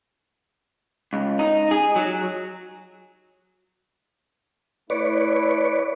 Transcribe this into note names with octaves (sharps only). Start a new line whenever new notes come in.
C#2
D#4
G#4
F#3
A3 E4 B4 C#5 D5